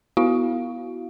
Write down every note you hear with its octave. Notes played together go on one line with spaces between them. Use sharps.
B3 E4 F#4 F5